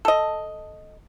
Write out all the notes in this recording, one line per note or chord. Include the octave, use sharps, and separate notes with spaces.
A4 D#5